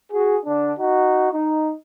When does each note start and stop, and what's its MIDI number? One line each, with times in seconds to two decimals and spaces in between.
0.12 0.36 66
0.12 0.36 68
0.46 0.73 50
0.46 0.73 62
0.79 1.30 63
0.79 1.30 66
1.33 1.73 63